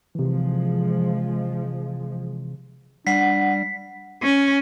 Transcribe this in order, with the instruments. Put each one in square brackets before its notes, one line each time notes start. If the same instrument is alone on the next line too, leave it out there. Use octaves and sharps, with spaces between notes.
[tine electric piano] C3 E3 [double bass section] F3 G#3
[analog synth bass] G3 [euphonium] D4 [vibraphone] F#5 [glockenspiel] B6 C7
[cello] C#4